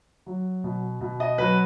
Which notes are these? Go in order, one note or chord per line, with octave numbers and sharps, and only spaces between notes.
F#3
B2
B2
D#5
F#3 B4